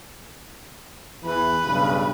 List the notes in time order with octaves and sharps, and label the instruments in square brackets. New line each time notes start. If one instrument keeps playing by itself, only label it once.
[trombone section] E2 E3 [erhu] B4
[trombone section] B1 G2 C#3